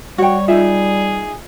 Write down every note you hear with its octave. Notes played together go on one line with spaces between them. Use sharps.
G3 F#4 C#5 G5
D#4 F4 G#4 E5